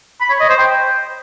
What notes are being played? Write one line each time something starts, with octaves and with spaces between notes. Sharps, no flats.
B5
C#5
D#5
C5
G5